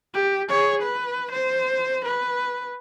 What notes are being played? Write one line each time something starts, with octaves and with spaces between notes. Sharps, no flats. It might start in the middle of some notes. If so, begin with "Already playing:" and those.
G4
G#4 C#5
B4
C5
B4